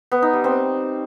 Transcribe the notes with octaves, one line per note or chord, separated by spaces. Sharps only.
B3
D#4
G3
C4